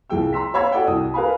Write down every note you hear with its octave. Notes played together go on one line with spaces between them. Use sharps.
C2 F3 G#4 G5 E6
A#5 C6 E6 B6
C#5 F5 B5 E6 G#6
F#4 A4 D5 F#5 G5
C2 F#4 D#6
A#4 B4 F5 G#5 B5